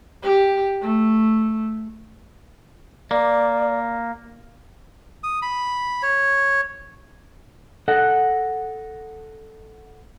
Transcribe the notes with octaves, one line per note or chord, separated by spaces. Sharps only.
G4
A3
A#3 D5
D#6
B5
C#5
A4 D#5 F#5